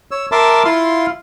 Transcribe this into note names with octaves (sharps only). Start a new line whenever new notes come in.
C#5 E6
A#4 E5 A5 C6 D6
E4 F4 F5 C6